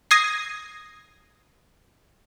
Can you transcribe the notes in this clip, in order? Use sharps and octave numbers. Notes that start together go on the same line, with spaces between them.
D#6 G#6 A#6 C7